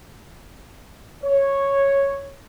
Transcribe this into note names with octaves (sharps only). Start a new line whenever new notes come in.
C#5